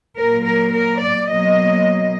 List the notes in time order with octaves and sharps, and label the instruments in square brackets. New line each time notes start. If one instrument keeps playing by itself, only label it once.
[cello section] A#2 F#3 A#3 A#4
A#4
A#4
D5
B2 F#3 A#3 D#5